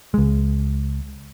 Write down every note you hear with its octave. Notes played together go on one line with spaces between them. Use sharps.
C#2 G#3